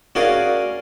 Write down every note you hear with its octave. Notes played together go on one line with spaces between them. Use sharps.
C#4 F#4 G#4 A#4 D5 F5